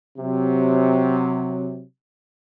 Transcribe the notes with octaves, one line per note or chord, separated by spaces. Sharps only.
C3 F#3